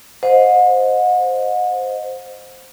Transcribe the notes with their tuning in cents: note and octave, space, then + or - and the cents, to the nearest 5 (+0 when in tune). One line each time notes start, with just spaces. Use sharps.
C5 +0 D#5 +0 F#5 -40